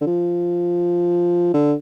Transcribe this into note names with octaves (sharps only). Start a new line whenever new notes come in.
D3
F3
D3